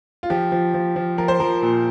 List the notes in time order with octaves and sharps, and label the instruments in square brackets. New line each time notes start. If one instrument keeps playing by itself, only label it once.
[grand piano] F4
F3 G4
F3
F3
F3
F3 A#4
C5
F3 A#4
A#2